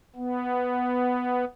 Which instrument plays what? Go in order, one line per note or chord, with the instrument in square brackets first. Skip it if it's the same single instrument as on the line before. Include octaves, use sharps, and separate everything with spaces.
[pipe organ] B3